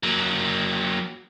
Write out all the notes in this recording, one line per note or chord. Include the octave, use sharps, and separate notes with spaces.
F#3 A#3